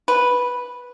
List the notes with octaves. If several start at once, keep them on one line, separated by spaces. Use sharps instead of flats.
B4